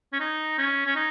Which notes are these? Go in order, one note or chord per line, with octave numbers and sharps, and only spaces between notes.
C#4
D#4
C#4
C#4
D#4